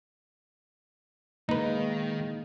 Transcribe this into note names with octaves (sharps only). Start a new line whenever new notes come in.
D#3 G#3 A#3 D#4 B4